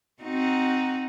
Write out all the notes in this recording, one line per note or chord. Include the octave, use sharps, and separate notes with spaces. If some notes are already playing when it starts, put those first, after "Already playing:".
C4 D#4 F#4